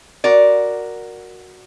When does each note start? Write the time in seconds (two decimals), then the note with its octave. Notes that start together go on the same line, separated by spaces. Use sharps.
0.24 F#4 A#4 D5